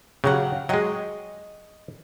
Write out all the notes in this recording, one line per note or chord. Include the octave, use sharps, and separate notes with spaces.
C#3 F#3 G4 F5 F#5
F#3 G#3 D#5 G5 C#6